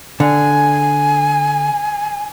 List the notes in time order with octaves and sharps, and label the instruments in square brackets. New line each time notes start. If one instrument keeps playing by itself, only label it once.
[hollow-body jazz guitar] D3 [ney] G#5